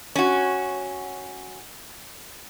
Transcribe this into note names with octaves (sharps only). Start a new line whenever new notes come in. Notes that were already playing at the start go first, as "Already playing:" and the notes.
C#4 F#4